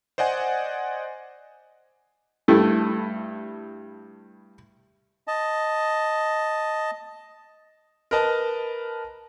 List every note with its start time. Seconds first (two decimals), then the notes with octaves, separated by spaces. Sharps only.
0.18 C5 D5 D#5 F#5 G#5
2.48 G2 A3 E4
5.28 D#5 A5
8.11 A#4 B4 D#5 A5